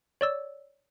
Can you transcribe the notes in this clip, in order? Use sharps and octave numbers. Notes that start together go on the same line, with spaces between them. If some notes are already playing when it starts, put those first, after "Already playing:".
C#5 D5 E6